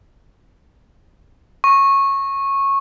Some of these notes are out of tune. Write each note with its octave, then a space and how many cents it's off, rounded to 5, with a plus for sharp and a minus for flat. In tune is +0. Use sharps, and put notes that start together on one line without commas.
C#6 -15